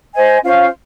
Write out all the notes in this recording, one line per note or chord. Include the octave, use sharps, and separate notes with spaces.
C5 D#5 G#5
C#4 F4 C5 F5